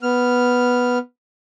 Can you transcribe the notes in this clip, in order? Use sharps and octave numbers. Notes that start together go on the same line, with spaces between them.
B3 F6